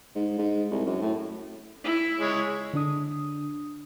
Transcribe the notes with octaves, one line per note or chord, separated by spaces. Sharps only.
G#2
G#2
C2
F#2
A2
E4
G#3 C#5
D3 D4 D#6